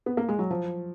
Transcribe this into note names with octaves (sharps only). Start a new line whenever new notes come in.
B3
A#3
G#3
F#3
F3